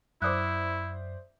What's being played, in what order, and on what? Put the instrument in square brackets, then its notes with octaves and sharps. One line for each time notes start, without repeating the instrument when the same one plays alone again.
[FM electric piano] F#2 [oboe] E4 [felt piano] C5 D5 E5 [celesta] D6 D#6 F#6